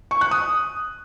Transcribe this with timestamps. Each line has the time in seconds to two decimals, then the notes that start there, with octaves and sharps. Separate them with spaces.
0.11 C#6
0.21 F#6
0.31 D#6